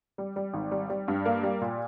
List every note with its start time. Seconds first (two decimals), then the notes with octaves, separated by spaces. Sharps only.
0.18 G3
0.36 G3
0.54 G#1
0.71 G3
0.90 G3
1.08 G2
1.26 A#3
1.43 G3
1.61 A#2